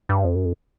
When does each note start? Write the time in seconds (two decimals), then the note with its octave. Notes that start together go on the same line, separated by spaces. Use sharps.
0.09 G2
0.24 F2
0.35 F#2
0.45 F2